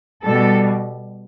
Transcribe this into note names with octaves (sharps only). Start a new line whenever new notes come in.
B2 G3 A4